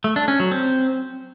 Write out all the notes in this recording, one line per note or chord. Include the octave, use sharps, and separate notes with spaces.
A3
D4
C#4
F#3
C4